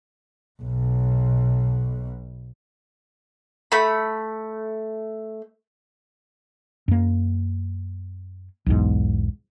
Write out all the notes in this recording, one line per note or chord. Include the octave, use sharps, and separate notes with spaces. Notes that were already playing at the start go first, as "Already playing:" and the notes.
B1 B2
A3 B5
F#2 A#3
B1 E2 G#2